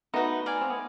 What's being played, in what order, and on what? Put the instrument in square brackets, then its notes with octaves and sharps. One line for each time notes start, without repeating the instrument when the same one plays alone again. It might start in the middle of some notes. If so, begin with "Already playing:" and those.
[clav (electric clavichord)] A3 B3 [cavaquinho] D#4 F#4 B4
[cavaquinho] D5 F5 G#5
[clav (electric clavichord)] C4
B3